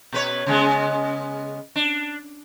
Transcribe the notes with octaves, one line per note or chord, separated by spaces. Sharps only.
B2 B4 C#5
C#3 G#3 B3
D4